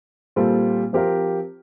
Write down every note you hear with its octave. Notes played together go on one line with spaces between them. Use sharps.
A#2 G3 C4 F4 A4
F3 C4 G4 A#4 F5